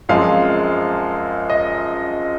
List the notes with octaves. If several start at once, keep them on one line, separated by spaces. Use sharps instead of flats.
F#2 F3 G#3 C4 F5
D#5